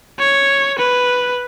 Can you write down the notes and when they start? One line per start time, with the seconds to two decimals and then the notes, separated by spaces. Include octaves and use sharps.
0.19 C#5
0.79 B4